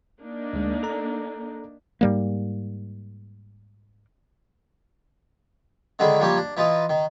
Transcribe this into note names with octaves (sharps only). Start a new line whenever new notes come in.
A#3 D4 D#4
D2 G#3
A4 A#5
G#2 G3 A#3
D3 D#3 G#3 A3 E4
F3 G3 A#3 G4 C#5
D4
E3 D#4 F4 D#5
D#3